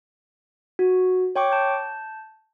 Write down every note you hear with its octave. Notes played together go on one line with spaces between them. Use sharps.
F#4
C#5 G5 C#6 D6
A5 G6